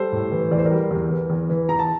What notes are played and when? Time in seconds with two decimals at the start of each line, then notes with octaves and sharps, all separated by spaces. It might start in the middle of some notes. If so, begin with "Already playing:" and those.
Already playing: G3 A4 C5
0.12 A2
0.32 E3
0.51 E2 D5
0.58 C5
0.65 A#4 D5
0.71 G3
0.91 E2
1.10 E3
1.30 E2
1.49 E3
1.69 E2 A#5
1.79 A5